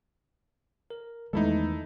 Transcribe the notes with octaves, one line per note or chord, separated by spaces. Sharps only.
A#4
E2 D#3 E3 G#3 A3 D#4 E4 A4